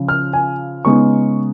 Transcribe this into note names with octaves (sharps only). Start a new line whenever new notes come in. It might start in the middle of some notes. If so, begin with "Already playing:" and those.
Already playing: C#3 F3
F6
G#5
C#3 G#3 B3 D#4 C#6